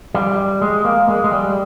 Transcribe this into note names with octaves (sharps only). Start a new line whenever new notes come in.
G3
G#3
A#3
G#3
G#3
G3